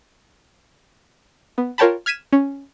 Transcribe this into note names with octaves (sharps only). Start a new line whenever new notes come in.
B3
F4 A#4 C#5 G5 A5 B5
F6 G#6 B6 D#7 E7
C#4